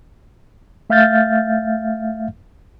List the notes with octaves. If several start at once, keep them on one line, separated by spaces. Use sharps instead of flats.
A3 E5 F5 F6 G6 A6